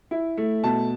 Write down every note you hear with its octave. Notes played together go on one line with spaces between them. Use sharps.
E4
A3
B2 A5